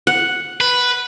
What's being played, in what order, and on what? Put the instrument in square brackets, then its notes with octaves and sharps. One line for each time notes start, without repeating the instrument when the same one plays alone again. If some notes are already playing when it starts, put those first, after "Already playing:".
[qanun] F#5
[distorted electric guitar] B4